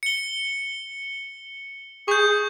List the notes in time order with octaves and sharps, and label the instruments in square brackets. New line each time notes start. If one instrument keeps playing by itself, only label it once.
[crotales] C#7 G7
[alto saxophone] G#4 [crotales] C#6 G6